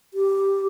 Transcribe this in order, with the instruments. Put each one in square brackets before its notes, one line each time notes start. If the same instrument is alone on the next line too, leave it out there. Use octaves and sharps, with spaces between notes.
[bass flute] G4